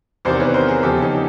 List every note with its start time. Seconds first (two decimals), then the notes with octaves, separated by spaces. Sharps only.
0.25 E2 C3 D#3 C5 D5
0.40 B4 C#5
0.54 A#4 C5
0.68 G#4 A#4
0.83 E2 C#3 F3 G4 A4
1.02 C#4 D#4